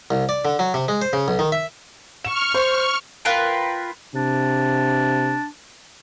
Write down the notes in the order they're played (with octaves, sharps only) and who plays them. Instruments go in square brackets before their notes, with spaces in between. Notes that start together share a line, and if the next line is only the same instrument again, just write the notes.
[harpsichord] C2
D5
D3
F#3
C3
G#3
C5
C#3
B1
D#3
E5
[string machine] C#6 F6 [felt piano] E7
[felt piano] C5
[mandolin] F4 A#4 B4 G5
[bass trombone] C3 [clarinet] D4